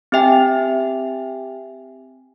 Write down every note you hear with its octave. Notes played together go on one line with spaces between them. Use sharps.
C4 G4 E5 G5 G#5